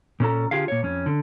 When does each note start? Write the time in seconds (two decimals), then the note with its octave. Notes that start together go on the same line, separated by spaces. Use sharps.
0.20 A#2 C#4 A4 A#5
0.51 D3 F4 G4 G#4 F5
0.68 A#2 C#5
0.83 F2 C#4
1.06 D3